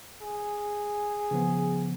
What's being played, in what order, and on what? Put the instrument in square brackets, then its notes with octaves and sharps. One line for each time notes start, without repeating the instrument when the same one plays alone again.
[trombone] G#4
[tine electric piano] C#3 F3 B3